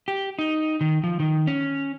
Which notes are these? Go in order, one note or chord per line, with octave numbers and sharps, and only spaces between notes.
G4
D#4
D#3
F3
D#3
C#4